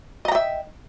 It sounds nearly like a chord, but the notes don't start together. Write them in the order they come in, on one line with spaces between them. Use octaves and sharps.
D#5 A#5 G5 E5